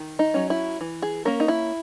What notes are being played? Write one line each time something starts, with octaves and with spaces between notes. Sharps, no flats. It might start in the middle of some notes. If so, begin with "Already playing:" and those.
Already playing: D#3
D#4
F#3 C#4
E4
E3
G#4
A#3 C#4 A#4
D#4
E4